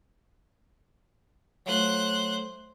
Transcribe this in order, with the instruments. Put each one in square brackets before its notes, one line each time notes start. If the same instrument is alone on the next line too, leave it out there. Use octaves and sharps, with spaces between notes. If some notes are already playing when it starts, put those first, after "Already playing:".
[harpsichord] F#3 A3 F4 [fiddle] C5 F#6